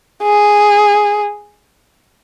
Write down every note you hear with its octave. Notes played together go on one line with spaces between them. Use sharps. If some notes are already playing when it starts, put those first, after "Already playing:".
G#4